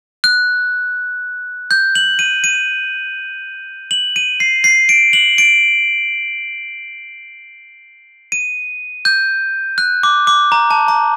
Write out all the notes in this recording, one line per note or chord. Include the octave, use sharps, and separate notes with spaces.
F#6
G6
F#7
D#7
D#7
F#7
D#7
C7
C7
D7
F#7
D7
D#7
G6
F#6
D6
D6
A#5
A5
A#5